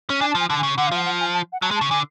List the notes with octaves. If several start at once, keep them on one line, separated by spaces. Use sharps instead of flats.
C#4
D4 G#5
A5
F3
G#5
D3 A5
G#5
C#3
D3 F#5
F5
F3 F#5
F#5
G#5
A5
F#5
F#3 A5
G#3
A5
C#3
D3 G#5